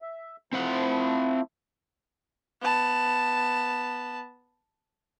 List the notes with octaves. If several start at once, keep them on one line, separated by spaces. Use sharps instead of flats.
E5
F3 A3 C4 E4 C5 F#5
B3 A5